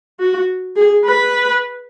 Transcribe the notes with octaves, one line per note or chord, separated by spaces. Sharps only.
F#4
G#4
B4